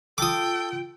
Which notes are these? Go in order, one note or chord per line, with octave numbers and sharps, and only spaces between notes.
F4 A4 G5 D6 D#6 D7